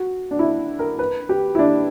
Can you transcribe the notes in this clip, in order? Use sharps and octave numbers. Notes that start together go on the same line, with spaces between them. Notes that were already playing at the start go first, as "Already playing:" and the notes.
Already playing: F#4
D4
E4
A#4
B4
G4
E4
D4